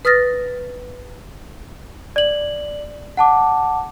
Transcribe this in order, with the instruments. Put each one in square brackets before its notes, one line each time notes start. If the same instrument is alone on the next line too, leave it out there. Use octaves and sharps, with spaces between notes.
[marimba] B4 D#6 F6 A6 A#6
[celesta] D5 F#7
F#5 A5 D6